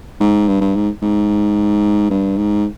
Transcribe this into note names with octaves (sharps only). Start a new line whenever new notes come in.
G#2
G2
G2
G#2
G#2
G2
G#2